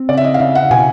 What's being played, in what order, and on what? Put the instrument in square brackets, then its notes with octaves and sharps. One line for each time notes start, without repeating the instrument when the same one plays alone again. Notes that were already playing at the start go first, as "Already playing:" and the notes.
Already playing: [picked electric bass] C4
[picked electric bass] C#3 [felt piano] D5
[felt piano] E5
D#5
F5
[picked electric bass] C#3 [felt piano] E5
[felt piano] F#5
[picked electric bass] B2 [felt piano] G#5